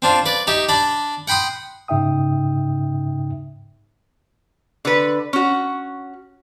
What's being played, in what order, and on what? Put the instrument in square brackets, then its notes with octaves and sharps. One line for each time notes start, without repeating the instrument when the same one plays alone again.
[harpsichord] C4 D4 F4
B4 D5
D#4 G4 E5
D4 D5 B5
F#5 G5 B5 C6 D#6
[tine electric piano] G#2 C#3 D#4 E5 G5 D#6
[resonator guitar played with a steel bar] D3 B4
C#4 F#4